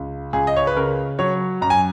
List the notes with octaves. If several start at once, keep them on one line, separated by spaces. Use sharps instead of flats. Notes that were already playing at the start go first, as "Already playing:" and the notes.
Already playing: C#2
C#2 G#4
D#5
C#5
B4
C#3 A#4
F#3 C#5
F#2 A#5
G#5